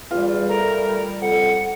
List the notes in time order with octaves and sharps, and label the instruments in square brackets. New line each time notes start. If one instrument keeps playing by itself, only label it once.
[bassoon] E2 [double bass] G3 [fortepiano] F4
[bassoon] A3 [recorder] A#4
[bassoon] F2 [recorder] F#5